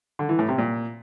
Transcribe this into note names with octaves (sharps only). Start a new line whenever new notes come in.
D3
E3
A2
C3
A#2